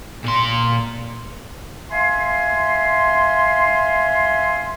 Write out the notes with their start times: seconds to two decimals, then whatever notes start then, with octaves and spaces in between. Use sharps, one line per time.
0.25 A#2 C6
1.92 E5 F5 G#5 C6